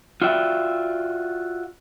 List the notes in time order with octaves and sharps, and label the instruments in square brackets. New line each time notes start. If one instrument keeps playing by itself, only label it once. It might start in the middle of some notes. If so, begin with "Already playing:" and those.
[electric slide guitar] F4 F#4 D5 E5 G5